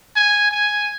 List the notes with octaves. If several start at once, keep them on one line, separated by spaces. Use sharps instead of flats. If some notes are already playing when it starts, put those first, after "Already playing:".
G#5
G#5